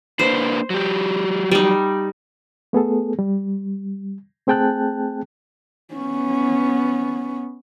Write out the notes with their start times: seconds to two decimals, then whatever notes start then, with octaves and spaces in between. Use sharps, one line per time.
0.19 A#3 D4 B4 C5
0.70 F#3 G4
1.51 G3 D#4
2.73 A3 B3 G#4 A4
3.19 G3
4.47 A3 C4 G#4 G5 A5 F#6
5.94 B3 C#4